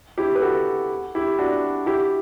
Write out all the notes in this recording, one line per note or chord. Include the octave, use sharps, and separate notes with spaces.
E4 G4
B4
F#4 A4
E4 G4
D4 F#4
E4 G4